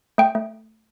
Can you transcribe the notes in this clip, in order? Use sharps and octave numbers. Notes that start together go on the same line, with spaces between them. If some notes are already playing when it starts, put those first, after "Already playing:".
A3 G5
A3